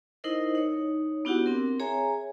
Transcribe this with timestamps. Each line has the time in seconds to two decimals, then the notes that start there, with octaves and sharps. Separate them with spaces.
0.24 D#4 E4 A#4 C5 D#5
0.55 D#4 C#5
1.25 B3 D4 E4 F#4 G4 F#5
1.46 C4 A#4
1.80 G#4 C#5 E5 G#5 A#5